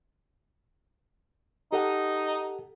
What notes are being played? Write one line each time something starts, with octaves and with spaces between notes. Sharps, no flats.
D#4 G4 A4 F#5